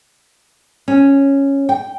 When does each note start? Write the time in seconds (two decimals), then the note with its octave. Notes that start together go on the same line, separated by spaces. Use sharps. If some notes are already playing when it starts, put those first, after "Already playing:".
0.88 C#4
1.69 G5